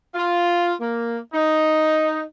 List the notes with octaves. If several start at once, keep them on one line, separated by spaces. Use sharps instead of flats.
F4
A#3
D#4